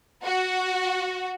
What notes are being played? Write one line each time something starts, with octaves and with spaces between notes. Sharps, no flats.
F#4